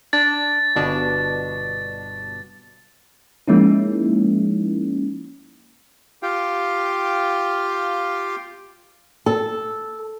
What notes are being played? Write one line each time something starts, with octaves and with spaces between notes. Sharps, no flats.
D4 A6
G1 B2 D4
F3 G#3 A#3 C#4 D#4 E4
F4 G4 F5 G5
A4